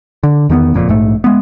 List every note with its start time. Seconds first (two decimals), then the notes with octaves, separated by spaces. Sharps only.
0.23 D3
0.49 E2 D#3 A#3 B3
0.74 F#1 F2 A#2
0.88 A#1 G#2 A3
1.24 G#3 B3